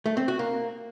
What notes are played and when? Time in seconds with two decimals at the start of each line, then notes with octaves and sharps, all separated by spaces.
0.06 A3
0.17 C4
0.28 F#4
0.39 A#3